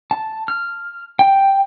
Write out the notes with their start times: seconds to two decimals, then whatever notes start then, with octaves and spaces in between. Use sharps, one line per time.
0.11 A5
0.48 F6
1.19 G5